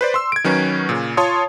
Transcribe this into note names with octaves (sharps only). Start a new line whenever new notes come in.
B4 C5 D5
C6 E6
G#6 D7
D#3 F#3 C#4 B4
A#2 C#3
F4 C#5 A5 C6 D#6